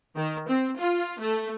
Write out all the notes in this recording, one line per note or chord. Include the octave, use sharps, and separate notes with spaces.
D#3
C4
F4
A3